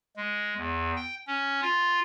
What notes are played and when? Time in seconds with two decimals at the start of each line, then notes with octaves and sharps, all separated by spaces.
0.17 G#3
0.57 E2
0.96 G5
1.27 C#4
1.62 F4